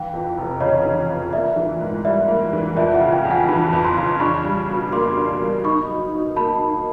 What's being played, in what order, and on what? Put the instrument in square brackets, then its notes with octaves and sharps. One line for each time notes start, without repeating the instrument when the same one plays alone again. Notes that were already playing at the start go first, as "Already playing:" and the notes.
Already playing: [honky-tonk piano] E3 [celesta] F5 G5
[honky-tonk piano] F2
F1
[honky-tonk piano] C#3 [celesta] C#5 D#5
[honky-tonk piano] E3
F2
[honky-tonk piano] A#3 [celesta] D5 E5
[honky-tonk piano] E3
G#2
[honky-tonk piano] G3 [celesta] D5 E5
[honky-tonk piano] A#3
E3
[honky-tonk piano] F2 [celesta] D5 E5
[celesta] E5 F#5
[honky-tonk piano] C#3
[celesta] F5 G5
[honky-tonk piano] F2
[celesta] F#5 G#5
[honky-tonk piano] E3 [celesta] A5 B5
[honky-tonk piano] F2
[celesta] A#5 C6
[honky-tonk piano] C#3
[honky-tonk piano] D4 [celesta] B5 C#6
[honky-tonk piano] G3
B2
[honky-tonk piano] A#3 [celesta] C6 D6
[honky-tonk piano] D4
G3
[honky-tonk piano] D#4 [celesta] B5 C#6
[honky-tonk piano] F#3
B2
[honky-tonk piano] A#3 [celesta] A5 B5
[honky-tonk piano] D#4